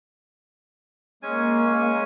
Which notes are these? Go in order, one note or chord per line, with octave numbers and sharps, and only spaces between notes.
G#3 A#3 C#4 G#5